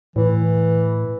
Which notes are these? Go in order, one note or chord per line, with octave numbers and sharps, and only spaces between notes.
A2 E3